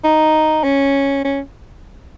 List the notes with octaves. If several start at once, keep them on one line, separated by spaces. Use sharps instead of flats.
D#4
C#4
C#4